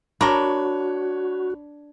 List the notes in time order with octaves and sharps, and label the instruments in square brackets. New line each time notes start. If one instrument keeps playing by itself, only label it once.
[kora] D4 [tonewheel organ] F#4 [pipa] A#4 A#5 [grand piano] C#5 B5